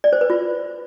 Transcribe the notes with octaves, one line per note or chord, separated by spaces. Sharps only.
D5
C5
B4
F4